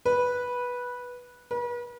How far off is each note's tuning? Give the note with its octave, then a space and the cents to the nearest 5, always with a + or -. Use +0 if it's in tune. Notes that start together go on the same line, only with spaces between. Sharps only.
B4 -10
B4 -40